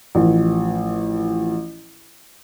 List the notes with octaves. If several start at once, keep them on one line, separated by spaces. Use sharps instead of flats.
A1 F3